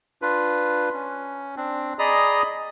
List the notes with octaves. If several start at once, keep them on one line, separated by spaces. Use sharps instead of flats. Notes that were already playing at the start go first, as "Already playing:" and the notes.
D4 F4 B4
C#4
C4 D4
G#4 D5 D#5 A#5 B5 D#6